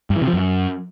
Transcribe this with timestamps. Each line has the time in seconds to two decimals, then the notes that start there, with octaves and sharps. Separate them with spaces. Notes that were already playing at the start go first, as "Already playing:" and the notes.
0.10 G2
0.16 E3
0.22 C3
0.27 F3
0.33 F#2